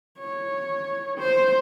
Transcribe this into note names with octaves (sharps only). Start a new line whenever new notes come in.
C#5
C5